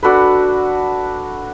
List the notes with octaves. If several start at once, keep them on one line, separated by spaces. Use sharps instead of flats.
D4 F#4 A4 B4